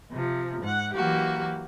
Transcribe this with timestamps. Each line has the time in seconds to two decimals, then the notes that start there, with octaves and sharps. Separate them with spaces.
0.12 C3 F3
0.63 G#2 F#5
0.94 E3 F#3 A#3 F#4 G4